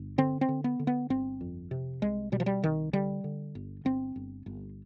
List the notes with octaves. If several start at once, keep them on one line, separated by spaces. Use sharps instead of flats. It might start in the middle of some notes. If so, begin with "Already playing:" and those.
Already playing: G1
D3 C4
C4
D3
B3
D3
B3
G1 C4
F2
C3
C2 G#3
B2 G3
F3
G3
C2 D#3
D3 G3
D3
G1
G1 C4
G1
G1